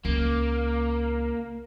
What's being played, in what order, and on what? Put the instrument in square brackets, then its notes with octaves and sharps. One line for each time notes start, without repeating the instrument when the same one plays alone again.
[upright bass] C#2 [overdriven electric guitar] A#3